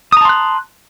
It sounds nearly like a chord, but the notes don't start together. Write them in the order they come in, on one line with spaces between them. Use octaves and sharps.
D#6 A#5 A5 C6 F#6